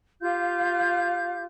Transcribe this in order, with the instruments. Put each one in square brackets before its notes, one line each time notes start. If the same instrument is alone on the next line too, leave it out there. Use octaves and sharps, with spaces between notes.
[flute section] F4 G4 F5 G6